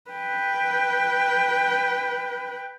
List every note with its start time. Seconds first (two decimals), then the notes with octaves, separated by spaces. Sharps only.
0.11 B4 G5